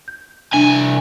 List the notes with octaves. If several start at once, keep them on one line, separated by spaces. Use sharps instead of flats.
G6
C2 D4 G#5